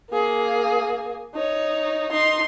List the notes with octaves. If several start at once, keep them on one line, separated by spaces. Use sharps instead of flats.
A#3 G#4
D#4 C#5
D#4 C6